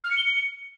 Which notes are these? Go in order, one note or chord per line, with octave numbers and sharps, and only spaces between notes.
F6
C#7
G7
C#7